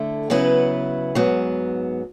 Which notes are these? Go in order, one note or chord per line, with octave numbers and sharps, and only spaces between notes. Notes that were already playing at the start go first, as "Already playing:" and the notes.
Already playing: D3 A3 E4 A4
C#3 F#3 B3 E4 B4
G#2 F#3 B3